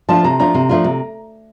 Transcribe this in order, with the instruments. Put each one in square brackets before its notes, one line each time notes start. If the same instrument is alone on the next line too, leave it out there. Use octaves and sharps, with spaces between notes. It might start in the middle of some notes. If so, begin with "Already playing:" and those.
[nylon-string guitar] F3 A3 D4 F4 [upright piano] A5
[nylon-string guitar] C3 [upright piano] A#5
[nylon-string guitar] F3 A3 D4 F4 [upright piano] A#5
[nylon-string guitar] C3
F3 A3 D4 F4
C3